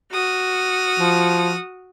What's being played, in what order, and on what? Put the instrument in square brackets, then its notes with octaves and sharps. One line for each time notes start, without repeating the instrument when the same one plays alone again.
[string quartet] F#4 D#6 F6
[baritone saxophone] F3